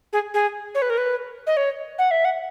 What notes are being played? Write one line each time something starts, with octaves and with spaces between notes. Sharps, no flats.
G#4
G#4
C#5
B4
A#4
B4
D#5
C#5
F#5
E5
F#5